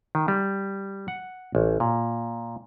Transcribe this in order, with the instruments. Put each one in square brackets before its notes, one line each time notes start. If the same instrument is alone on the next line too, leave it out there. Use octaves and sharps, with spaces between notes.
[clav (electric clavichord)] D#3
G3
F#5
A1
A#2